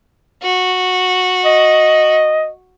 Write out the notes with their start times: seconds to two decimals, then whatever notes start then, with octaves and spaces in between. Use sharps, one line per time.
0.43 F#4
1.45 D#5